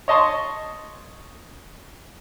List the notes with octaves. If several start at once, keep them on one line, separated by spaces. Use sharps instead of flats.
C#5 D#5 A5 C6 C#6